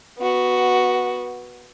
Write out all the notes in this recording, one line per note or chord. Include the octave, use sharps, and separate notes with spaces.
B3 F#4